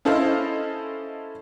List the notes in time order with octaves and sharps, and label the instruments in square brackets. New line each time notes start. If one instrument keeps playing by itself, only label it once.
[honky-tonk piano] C#4 E4 A4 C5 D#5 F5